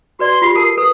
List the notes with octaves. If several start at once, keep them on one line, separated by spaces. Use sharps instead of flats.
F#4 B4 D5 C6
F4 G4 C7
A4 A#4 A5 C7
A4 B4 D#6